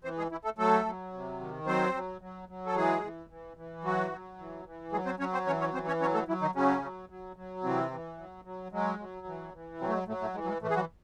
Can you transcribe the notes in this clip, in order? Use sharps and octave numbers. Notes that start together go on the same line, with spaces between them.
E3 C4 C5
G#3 G#4
E3 E4
A3 A4
F#3 A3 A4
F#3
C3
D#3
F#3 C4 C5
F#3
F#3
F#3
A4
E3 G#3 G#4
E3
E3
E3
F#3 F#4
F#3
E3
E3
F#3 G#3 G#4
C4 C5
F#3 C#4 C#5
C4 C5
E3 C#4 C#5
C#4 C#5
E3 C4 C5
C#4 C#5
F#3 C#4 C#5
A3 A4
E3 F#3 E4
D#3 D#4
C#3 F#3 C#4
F#3
F#3
F#3
C3 E3 C4
E3
F#3
F#3
F#3 G#3
F#3
E3
E3
C3 F#3 C4
A3
G#3
A2 F#3 A3
A2 A3
E3 G#3
F#3
G#3
A2 E3 A3
G#4
F#3 F#4